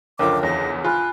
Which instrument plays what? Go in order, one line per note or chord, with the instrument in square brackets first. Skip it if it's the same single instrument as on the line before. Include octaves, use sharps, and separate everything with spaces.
[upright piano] F#1 D2 F3 [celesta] A#4 C#5 G5 [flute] D6
[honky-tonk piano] E2 [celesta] C#5 [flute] A#6
[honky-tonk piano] F4 [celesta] G#5 B5 [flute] F#6